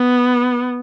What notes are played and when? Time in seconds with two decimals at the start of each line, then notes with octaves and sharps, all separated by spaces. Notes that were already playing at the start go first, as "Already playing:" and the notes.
Already playing: B3